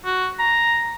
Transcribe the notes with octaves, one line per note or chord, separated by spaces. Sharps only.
F#4
A#5